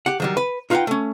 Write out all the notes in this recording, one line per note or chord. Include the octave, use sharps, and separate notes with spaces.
G4 F#5
D#3 F#3 G3
B4
D#4 F4 B4 E5 F#5 G5
A3 C#4